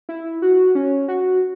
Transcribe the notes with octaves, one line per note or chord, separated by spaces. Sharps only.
E4
F#4
C#4
F#4